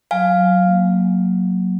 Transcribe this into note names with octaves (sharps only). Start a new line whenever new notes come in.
F#3 F5 G#5
F#3
A#3